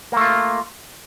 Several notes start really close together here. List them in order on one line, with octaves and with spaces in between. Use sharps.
A#3 A3 F4